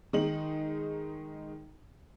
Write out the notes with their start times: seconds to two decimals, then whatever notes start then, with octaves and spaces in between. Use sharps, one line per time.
0.13 D#3 G#3 D#4 F#7